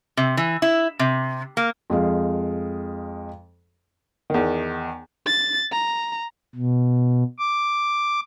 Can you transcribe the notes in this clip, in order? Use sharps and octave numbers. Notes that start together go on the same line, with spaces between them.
C3
E3
E4
C3
A#3
F2 G#3 F5
E2 D#3
A6
A#5
B2
D6